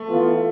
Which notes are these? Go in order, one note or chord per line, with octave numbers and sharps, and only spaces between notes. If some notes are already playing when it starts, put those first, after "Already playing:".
Already playing: A3
E3 B3 F4